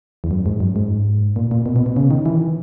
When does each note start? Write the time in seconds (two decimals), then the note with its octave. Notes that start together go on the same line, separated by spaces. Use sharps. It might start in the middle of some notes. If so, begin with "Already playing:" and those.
0.24 E2
0.31 F#2
0.46 G#2
0.60 F#2
0.76 G#2
1.36 A#2
1.51 A#2
1.66 B2
1.76 B2
1.86 B2
1.96 C#3
2.11 D#3
2.26 E3